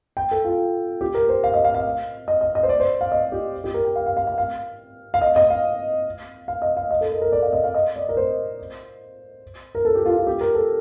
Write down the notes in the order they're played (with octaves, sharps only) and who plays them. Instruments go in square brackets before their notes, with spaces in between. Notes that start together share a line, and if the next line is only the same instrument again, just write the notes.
[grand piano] G5
A4
F4
G4
A#4
C5
F5
D#5
F5
F5
D#5
D#5
D#5
C5
D5
C5
F5
D#5
G4
G4
A#4
G5
F5
F5
F5
F5
F5
F5
D#5
D#5
F5
F5
D#5
F5
D#5
A4
A#4
A#4
D5
F5
D#5
F5
D#5
D5
A#4
C5
A#4
A4
G4
F4
F4
G4
A#4
A4